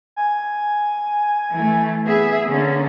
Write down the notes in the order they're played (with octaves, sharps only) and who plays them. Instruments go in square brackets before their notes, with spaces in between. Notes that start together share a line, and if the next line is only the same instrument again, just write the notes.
[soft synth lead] G#5
[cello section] E3 A3
B3 G#4 E5
D3 A#3 C#4